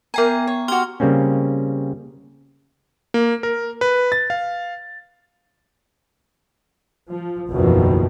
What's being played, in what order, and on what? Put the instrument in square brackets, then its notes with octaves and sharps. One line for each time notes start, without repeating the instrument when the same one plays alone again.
[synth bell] B3 G5 A#5 [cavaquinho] A#4 G#5
[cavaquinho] C#5
[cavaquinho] F#4 G4 [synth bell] C6 F6 G7
[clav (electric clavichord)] C#3 G3 A#3 C4 C#4
[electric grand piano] A#3
A#4
B4
A6
F5
[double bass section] F3
F#1 B1 E2 B2 D#3 F3